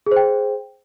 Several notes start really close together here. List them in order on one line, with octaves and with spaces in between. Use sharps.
G#4 C5 G5